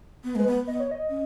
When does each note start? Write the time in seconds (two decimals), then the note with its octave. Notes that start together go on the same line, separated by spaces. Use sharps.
0.24 B3
0.35 G#3 B4
0.47 B3
0.67 B3 D#5
0.80 C#5
0.91 D#5
1.10 C#4